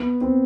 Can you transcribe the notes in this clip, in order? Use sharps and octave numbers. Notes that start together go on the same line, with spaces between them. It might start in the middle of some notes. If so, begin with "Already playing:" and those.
Already playing: B3
C4